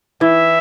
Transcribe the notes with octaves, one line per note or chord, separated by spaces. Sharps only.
E3 E5